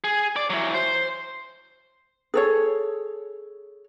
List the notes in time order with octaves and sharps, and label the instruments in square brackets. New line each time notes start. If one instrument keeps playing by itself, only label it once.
[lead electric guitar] G#4
D5
E3 F#3
C5
[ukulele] G#4 A4 C#5